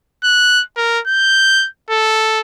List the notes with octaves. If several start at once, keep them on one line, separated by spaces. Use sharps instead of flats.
F#6
A#4
G6
A4